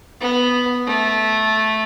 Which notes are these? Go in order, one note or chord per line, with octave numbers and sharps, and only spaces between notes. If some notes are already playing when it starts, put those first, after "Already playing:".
B3
A3